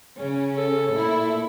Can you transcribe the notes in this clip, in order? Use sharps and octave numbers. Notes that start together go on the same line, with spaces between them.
C#3 C#4
A4
A#2 E4